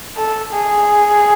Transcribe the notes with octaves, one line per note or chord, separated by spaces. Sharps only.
A4
G#4